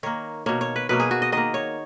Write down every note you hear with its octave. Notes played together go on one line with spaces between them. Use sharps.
D#3 A#3 C#5
B2 A#3 C#5
C#5
B4
B2 F#3 A#3 B4
G#4
F#4
D#5
D#3 A#3 D#5
C#5